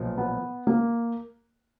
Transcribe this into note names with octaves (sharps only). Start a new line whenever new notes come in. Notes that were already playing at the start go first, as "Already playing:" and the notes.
Already playing: B1 A#2 F3
B3
A#3